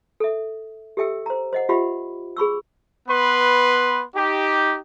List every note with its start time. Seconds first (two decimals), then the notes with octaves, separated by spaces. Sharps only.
0.20 A4 E5
0.97 G4 A4 E5 G5 E6
1.26 C5 A#5
1.53 C5 D#5 F#5
1.69 F4 G4 C5 E5 F#5 B5
2.37 G#4 B5 C#6 E6
3.08 B3 B4 C6
4.15 D#4 G4